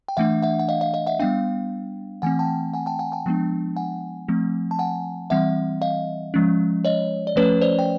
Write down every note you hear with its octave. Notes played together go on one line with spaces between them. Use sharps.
G5
E3 A3 D4 E5 F#5
E5 F#5
F#5
D#5 F5
D#5 F5
D#5 F5
E5 F#5
G3 B3 D4 F5 G5
E3 A3 C4 F#5 G#5
G5 A5
F#5 G#5
G5 A5
F#5 G#5
G5 A5
F3 G#3 B3 D4
F#5 G#5
F3 A3 C4
A5
F#5 G#5
E3 G3 C4 E5 F#5
D#5 F5
F3 G#3 C#4
C#5 D#5
D5
F3 A3 C#4 B4 C#5
C5 D5
G5